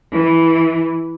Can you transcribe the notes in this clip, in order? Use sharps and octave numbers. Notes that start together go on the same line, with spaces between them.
E3